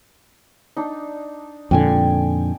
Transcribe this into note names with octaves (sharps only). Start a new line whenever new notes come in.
D4 D#4
F2 A#2 D3 G5 G#5